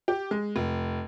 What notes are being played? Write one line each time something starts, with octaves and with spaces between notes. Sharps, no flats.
G4
G#3
F1